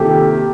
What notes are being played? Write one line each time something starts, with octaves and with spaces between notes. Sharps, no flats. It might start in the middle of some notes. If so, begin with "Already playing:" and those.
Already playing: C3 D#3 A#3 F4 G4 A4